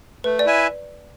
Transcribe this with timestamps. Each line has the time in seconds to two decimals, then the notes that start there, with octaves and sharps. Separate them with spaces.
0.24 A3 B4
0.39 D5
0.45 E4 B4 E5 G#5